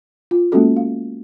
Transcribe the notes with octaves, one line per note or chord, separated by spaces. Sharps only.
F4
G#3 A#3 B3 C#4 F#4 A4
F5